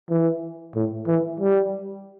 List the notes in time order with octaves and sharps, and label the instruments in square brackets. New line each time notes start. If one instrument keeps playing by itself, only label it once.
[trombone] E3
A2
E3
G3